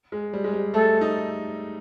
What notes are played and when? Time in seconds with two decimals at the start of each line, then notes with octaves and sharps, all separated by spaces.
0.12 G#3
0.33 G3
0.44 G#3
0.53 G3
0.74 A3 A4
1.01 D#4